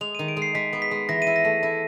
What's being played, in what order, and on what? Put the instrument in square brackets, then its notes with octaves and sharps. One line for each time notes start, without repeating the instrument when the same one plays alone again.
[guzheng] G#3 [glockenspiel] F7
[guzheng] D#3 [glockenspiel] D#7
[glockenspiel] D7
[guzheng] G#3
[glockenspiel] C7
[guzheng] G#3 [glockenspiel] B6
[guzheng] B3
[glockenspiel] B6
[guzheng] G#3
[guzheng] E3 [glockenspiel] A#6
[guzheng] E4 [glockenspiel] D#7
[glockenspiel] A#6
[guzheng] A3
E4